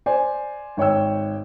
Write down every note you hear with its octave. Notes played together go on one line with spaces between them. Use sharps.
C5 D5 G#5
G#1 C#5 G5 E6